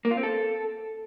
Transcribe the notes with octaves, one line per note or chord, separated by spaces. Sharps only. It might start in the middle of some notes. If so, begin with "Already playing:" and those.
A#3
F4
C4
A4